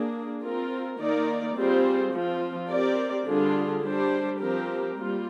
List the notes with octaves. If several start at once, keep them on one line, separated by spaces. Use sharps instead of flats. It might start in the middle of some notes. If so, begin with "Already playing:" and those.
Already playing: A#3 D4 G#4
C4 F4 A#4
D#3 A#3 D#4 A#4 D5
G3 C4 F4 G#4 C5
F3 C4 F4
C4 G4 A#4 D5
D3 G3 D4 F4 G#4
G3 D4 G4 C5
F3 C4 G4 A#4
G3 A#3 F4